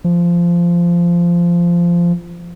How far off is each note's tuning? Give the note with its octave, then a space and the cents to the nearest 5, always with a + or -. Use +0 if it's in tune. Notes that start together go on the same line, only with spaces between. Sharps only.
F3 -15